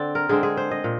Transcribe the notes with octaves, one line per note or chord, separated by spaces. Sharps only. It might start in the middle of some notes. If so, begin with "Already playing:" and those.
Already playing: D3 C4 D5
A#4
D3 G#3 C4 G#4
G#4
C5
D#5
A#2